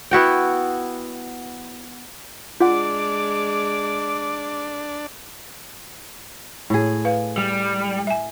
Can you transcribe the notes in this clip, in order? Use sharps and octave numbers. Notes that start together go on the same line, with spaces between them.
B3 E4 F#4 G5
G#3 D4 F4 F#5 D6
A2 G#4
B4 F5
G3
E5 G#5